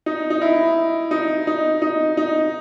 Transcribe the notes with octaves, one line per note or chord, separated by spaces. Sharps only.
D#4
D#4
E4
D#4
D#4
D#4
D#4